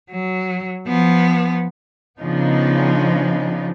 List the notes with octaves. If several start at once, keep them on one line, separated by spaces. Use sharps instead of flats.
F#3
F3 B3
C#3 F3 B3 D4 D#4